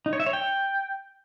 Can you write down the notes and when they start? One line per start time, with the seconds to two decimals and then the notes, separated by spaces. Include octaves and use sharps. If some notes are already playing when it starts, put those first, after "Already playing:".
0.06 D#4
0.13 C#5
0.20 E5
0.26 C#5
0.33 G5